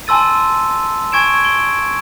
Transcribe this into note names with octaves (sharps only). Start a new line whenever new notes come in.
G#5 A5 C6 E6 A6 D#7
G#5 C#6 G#6 D7 E7
D7 G7